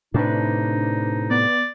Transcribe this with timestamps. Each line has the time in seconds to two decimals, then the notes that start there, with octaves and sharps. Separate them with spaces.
0.14 A2 C3 D4 D#4 B4
1.30 B3 D5